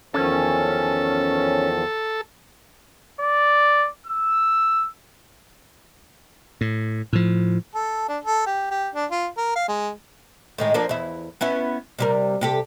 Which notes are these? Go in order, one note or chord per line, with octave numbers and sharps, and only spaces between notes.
E2 D#3 F3 C#4 A4
D5
E6
A2
A2 F3
A4
D4
A4
G4
G4
D4
F4
A#4
F5
G#3
A2 D#3 G#3
F3 A#3 D4
E2 E4
B3 C#4 E4
C3 G3 A#4
C3 G4 A4